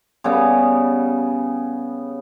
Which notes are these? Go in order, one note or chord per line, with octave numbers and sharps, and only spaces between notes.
C#3 G3 B3